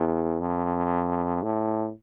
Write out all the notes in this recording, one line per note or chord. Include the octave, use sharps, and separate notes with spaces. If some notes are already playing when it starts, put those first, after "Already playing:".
Already playing: E2
F2
A2